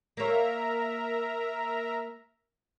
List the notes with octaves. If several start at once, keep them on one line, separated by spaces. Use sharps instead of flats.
A#3 A#4 C#5 E5 A#5